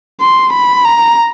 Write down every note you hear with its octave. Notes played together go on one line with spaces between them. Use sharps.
C6
B5
A#5